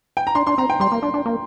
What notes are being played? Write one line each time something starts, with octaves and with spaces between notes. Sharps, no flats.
G5
A#5
D4 C6
D4 C6
C4 A#5
G5
G3 C6
A#3
D4
D4
A#3